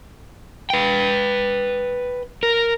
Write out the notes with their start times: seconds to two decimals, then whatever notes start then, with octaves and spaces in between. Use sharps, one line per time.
0.70 B4 G5
2.43 A#4